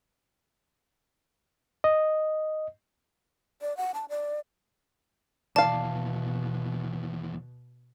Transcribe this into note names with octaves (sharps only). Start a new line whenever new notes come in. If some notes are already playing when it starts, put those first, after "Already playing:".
D#5
D5
F#5
A5
D5
D#2 B2 E3 D5 F5 A5